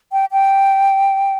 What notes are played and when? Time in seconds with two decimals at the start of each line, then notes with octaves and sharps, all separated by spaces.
0.12 G5
0.32 G5